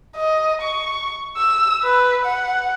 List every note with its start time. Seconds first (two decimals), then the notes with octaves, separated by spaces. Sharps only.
0.16 D#5
0.62 C#6
1.37 E6
1.83 B4
2.25 F#5